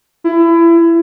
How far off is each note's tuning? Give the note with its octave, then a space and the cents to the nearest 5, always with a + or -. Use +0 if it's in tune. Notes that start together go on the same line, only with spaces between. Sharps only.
E4 +25